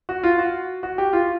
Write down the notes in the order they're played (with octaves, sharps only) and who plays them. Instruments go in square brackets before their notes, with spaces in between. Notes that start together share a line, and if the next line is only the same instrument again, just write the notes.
[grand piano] F#4
F4
F#4
F#4
G4
F4